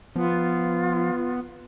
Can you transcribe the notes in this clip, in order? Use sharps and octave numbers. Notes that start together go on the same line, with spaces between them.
F3 B3 F4